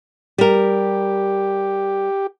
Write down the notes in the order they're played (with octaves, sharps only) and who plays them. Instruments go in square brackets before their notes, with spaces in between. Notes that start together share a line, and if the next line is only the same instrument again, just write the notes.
[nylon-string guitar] G3 A#4 [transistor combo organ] G4